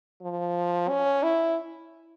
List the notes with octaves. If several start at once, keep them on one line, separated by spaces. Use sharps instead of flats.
F3
C#4
E4